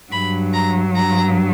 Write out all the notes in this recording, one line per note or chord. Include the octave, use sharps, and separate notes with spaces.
G2 F#3 B5
A#5
A#5